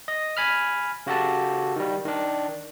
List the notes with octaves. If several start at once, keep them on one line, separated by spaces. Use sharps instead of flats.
D#5
G#5 B5 F6
C#3 F#4 G4 A4 A5
D#3 G3
D#3 D4